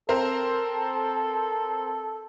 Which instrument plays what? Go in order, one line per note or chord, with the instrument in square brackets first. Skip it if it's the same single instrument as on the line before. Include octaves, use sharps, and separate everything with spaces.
[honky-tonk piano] C4 A#4 C5 [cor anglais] A4